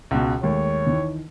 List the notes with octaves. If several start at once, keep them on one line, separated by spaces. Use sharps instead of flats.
C#2 B2
D#2 G#3 A3 C#5
D#3 E3